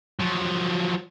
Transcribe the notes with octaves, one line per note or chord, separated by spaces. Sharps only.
F3 F#3